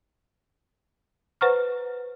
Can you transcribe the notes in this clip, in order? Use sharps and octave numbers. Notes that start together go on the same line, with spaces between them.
B4 C5 F#5 A#5 C#6 F6